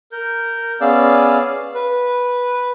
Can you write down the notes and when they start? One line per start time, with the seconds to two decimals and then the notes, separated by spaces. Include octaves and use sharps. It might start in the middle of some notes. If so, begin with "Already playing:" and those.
0.12 A#4 G6
0.81 B3 C#4 G#4 D5 F5 E6
1.75 B4